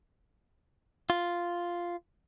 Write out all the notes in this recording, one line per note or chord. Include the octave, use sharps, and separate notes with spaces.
F4